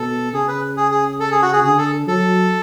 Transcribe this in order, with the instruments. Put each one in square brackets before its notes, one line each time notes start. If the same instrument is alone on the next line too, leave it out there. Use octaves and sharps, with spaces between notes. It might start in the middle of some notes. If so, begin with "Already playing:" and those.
Already playing: [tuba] B2 [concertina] A4
[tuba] C#3 [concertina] G#4
[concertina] B4
G#4
G#4
A4
G#4
F#4
G#4
[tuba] D3 [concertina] G#4
[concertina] A4
[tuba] F#3 [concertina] A4